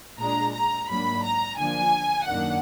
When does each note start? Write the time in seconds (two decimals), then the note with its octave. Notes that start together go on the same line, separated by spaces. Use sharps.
0.18 A#2 G#3 D4 A#5
0.53 A#5
0.89 G#2 F#3 A#3 D4 B5
1.24 A#5
1.58 D3 F3 A#3 D4 G#5
2.28 F#2 D#3 A#3 D4 F#5